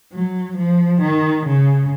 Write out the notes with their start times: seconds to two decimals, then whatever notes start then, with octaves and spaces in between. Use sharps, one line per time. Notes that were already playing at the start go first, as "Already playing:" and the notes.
0.12 F#3
0.57 F3
1.01 D#3
1.46 C#3